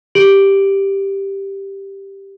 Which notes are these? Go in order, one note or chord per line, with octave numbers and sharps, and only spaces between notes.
G4 D7 F#7